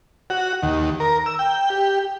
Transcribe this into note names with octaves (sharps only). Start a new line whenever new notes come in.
F#4
D#2
A#4
E6
G5
G4